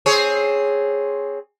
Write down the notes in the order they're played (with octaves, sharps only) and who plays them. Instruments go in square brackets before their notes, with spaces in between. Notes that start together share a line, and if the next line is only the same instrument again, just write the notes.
[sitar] C4 G#4 C#5